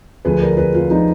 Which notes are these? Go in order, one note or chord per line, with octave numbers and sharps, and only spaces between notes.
D2 D3 F3 G#4 B4
A#4 D5
G#4 B4
F4 G#4
D3 F3 D#4